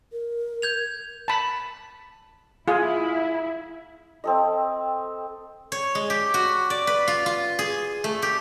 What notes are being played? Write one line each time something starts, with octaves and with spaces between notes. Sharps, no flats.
A#4
G6 G#6 F7
A5 B5
E4 F4 G#4
C4 A4 D#5
C#5
G#3
G4
F#4
D5
B4
F4
F4
G#4
A3
G4